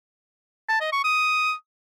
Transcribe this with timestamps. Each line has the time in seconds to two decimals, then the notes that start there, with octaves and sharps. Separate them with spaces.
0.69 A5
0.80 D#5
0.92 C#6
1.04 D#6